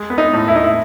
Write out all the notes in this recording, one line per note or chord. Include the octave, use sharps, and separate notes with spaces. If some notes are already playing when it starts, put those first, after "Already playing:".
Already playing: G#3
B3
D#4
A2
E4
A2 D#4
E4